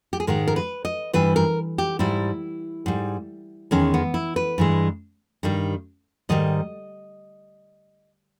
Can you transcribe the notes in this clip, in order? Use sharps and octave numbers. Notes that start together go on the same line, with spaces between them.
G4
G#4
G#2 D#3 G#3 A#4
A#4
B4
D#5
G2 E3 G3 B4
A#4
G4
G#2 G3 E4
G#2 G3
E2 D#3 G#3 C#4
B3
E4
B4
G2 E3 G#3
G2 D#3 G3
G#2 D#3 G3 D#5